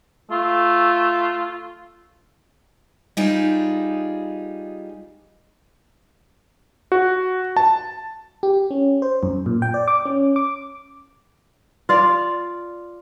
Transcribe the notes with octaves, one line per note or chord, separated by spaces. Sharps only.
A3 F4
G3 D#4 F4 G#4
F#4
A5
G4
C#4
C5
F#2
A#2
G5
D5
D6
C#4
D6
F4 D5 F5